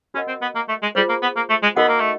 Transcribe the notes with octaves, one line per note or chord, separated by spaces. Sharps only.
C#4 F#4 A#4 D#5 F#5
C4
B3
A#3
A3
G#3
G3 F4 G#4 C5
A#3
B3
A#3
A3
G#3
B3 D#4 F#4 A#4 D#5 F#5
A#3
A3